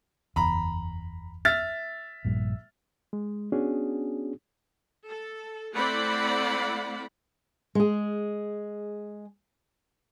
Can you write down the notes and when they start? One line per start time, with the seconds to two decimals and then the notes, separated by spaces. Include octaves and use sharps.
0.36 F#1 E2 A#5 B5
1.45 E5 F6 A6
2.25 A#1 G2 A#2
3.13 G#3
3.52 B3 C#4 D4 F#4 G#4
5.07 A4
5.73 A3 C4 E4 D5 F#5 B5
7.75 G#3 G#4